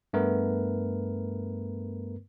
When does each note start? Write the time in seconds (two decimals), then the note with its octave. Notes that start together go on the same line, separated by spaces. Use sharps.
0.13 G2 A3 B3 A#4 B4